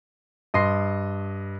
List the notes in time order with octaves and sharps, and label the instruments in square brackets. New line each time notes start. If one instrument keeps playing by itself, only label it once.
[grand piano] G2 D#5 C6 C7